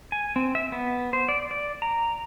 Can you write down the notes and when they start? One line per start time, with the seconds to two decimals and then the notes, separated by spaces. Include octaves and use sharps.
0.12 G#5
0.36 C4
0.55 E5
0.72 B3
1.13 C5
1.29 D5
1.51 D5
1.82 A#5